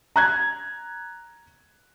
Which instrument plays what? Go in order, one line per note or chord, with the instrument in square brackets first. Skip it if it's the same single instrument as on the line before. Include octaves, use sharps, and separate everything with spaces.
[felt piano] A#5 F#6 G#6